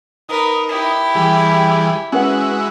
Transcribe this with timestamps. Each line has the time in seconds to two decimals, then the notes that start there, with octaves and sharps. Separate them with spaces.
0.29 D#4 A#4 B4
0.69 E4 G4
1.15 E3 G3 G#4
2.12 G#3 C#4 E4 F#4 B4 F#5